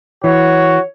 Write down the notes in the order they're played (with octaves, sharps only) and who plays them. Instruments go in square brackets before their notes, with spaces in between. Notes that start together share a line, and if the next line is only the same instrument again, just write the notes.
[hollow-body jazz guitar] E3 [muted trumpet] F#4 [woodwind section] C#5